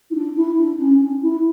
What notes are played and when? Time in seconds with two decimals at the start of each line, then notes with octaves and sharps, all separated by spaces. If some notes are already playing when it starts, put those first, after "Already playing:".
0.10 E4
0.14 D4
0.36 E4
0.58 D4
0.79 C#4
1.00 D4
1.22 E4